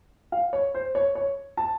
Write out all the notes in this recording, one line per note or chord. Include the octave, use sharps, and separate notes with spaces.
F5
C#5
C5
C#5
C#5
A5